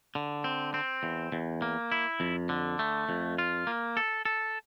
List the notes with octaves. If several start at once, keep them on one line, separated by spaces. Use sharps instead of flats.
D3
C4
C4
E2
E2
A#3
E4
F2
D3
A3
F2
F4
A#3
A4
A4